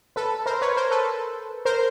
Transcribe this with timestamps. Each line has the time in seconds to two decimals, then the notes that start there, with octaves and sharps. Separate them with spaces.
0.16 A4 B4
0.46 A#4 C5
0.61 B4 C#5
0.77 A#4 C5
0.91 A4 B4
1.65 A#4 C5